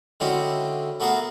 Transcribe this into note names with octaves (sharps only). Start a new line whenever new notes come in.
D3 G#3 C4 C#4 E4 F#4
A3 B3 F#4 G#4 A#4 F#5